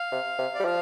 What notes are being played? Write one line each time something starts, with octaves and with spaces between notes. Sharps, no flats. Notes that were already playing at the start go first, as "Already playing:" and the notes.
Already playing: F5
C3
C3
G3 D5
F3 F5